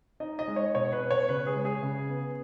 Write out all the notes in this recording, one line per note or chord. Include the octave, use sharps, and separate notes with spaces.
D#4 D#5
D#5
G#3
C#5
B2 C#5
B4
B3
C#5
C#3 B4
G#4
G#3
G#4
C#3
B3